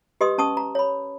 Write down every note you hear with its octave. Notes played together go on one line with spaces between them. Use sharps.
G4 B4 D#5 C6 D#6
C#4 A5 C#6 D#6
A#5
C#5 B5